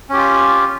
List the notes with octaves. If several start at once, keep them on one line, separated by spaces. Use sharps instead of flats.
C#4 F4 G4